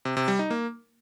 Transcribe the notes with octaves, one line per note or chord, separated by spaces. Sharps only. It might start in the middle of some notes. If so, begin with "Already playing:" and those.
C3
C3
G3
D#4
A#3